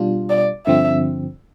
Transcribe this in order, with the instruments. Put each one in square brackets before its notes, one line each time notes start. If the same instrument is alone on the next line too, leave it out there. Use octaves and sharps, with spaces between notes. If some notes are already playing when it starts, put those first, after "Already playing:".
Already playing: [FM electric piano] B2 G3 D4 F4
[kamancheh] D5
[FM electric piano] G2 D3 F3 C4 [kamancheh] E5